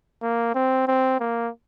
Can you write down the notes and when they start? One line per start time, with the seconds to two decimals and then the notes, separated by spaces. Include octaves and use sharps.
0.22 A#3
0.55 C4
0.87 C4
1.20 A#3